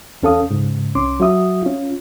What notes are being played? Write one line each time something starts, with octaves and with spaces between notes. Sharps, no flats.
E2 C#4 A4 F5 D#6
G#2 C#3
C2 C#4 C6 D6
F#3 F#4 E5 D#6
C#4 F4